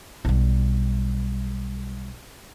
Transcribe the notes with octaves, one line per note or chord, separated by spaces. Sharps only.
B1 G3